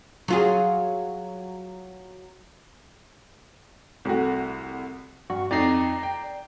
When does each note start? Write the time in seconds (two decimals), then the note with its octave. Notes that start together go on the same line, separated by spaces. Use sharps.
0.28 F#3 F4 G#4
4.05 C2 A3 F#4
5.30 G2 F#4
5.51 F2 D#4 D5 A#5 C7
6.03 G5